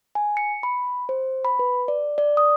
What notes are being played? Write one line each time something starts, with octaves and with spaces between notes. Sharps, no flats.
G#5
C#7
B5
C5
B5
B4
D5
D5
D#6